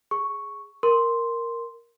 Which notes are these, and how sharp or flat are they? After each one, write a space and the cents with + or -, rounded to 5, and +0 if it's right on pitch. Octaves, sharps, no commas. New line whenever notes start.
G#4 +0 C#6 +0
A#4 +0 C6 +0